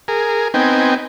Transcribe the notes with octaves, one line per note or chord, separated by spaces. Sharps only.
G#4 A#4
B3 C4 D#4 G5 G#5